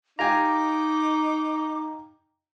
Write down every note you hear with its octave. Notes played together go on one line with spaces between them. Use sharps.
D#4 F4 G4 G#5 A#5 D6